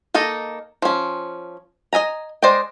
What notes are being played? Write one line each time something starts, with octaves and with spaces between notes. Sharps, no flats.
A#3 D#4 A4 D#5
F3 C#4
D#5 E5 G#5 A#5
G#3 C5 D5 D#5 G5